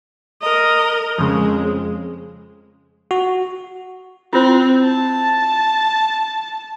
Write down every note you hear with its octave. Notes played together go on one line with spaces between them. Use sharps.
A#4 D#5
F2 C#3 G#3
F#4
C4 E4 F4 C5
A5